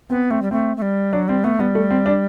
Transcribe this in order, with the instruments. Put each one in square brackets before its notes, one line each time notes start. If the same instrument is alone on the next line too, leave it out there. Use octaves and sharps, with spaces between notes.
[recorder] B3 [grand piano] C4
[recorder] A3 [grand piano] C4
[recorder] G3
[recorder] A3 [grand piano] C4
[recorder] A3
G3
[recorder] F#3 [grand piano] D4
[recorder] G3 [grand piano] C4
[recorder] A3 [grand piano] B3
[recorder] G3 [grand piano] B3
[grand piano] A3
C4
D4